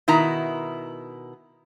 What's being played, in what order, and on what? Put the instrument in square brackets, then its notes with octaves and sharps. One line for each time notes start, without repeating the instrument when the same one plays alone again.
[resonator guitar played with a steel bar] B2 D#3 E4 A#5